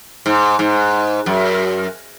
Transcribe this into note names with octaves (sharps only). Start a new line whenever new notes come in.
G#2
G#2
F#2